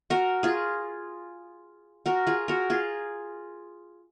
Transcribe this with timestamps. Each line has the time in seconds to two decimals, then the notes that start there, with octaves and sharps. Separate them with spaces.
0.10 F#4 A#4
0.43 F4 G#4
2.06 F#4 A#4
2.27 F4 G#4
2.48 F#4 A#4
2.70 F4 G#4